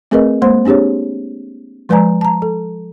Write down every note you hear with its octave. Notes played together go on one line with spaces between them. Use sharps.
A3 C4 G#4 A#4 B4 D#5
G#3 A#3 C5 C6
C4 D4 G4 G#4 C#5
F3 G#3 B4 D5 G#5 A#5
A5 A#5
A4